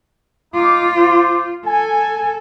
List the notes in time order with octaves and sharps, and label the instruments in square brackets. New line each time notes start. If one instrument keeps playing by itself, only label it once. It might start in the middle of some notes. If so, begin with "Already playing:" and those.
[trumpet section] D#4 D6 [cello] F4
[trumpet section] C5 D6
[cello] A4 [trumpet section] G#5